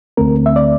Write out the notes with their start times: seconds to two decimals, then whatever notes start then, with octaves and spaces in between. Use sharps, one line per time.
0.17 D2 D3 A3 C4 A#4
0.46 E5
0.56 D5